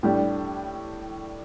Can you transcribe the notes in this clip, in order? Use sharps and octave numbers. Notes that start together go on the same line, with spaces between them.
A2 G3 D4 G4